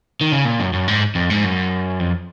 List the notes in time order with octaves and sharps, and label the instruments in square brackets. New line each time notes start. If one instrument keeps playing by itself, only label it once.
[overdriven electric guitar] D#3
C#3
A#2
F#2
F#2
G#2
F2
G#2
F#2
F2